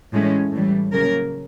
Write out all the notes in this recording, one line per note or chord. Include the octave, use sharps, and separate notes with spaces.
A2 E3 G#3 C#4
A2 E3 G3
C#3 F#3 A#3 A#4